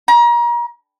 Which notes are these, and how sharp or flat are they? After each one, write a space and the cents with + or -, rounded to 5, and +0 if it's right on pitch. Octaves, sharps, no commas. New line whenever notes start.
A#5 +35